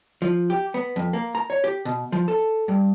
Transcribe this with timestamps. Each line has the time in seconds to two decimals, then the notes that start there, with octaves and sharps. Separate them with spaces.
0.22 F3
0.50 G4
0.74 B3
0.96 F2
1.13 A#3
1.35 A#5
1.50 C#5
1.64 G4
1.85 B2
2.12 F3
2.28 A4
2.68 G2